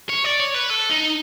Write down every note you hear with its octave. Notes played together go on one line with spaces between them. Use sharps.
C#5
D5
C#5
B4
A4
D#4